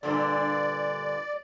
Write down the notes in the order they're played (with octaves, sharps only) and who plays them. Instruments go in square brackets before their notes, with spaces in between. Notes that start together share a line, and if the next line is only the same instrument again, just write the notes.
[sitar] G2 A#2 D3 [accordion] D5